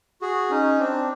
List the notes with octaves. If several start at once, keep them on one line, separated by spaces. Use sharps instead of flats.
F#4 G#4
C#4 D#4
C4 D4